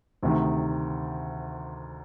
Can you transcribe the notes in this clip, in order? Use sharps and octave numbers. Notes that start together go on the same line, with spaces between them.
D2 C3 D#3